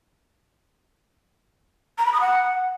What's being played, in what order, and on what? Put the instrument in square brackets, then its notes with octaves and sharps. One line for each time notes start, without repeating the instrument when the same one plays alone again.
[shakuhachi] A#5
B5
D#6
F#5